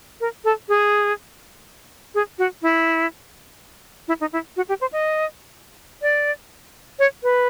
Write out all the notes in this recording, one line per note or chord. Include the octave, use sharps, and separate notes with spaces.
A#4
A4
G#4
G#4
F#4
E4
E4
D#4
E4
F#4
G4
C5
D#5
D5
C#5
B4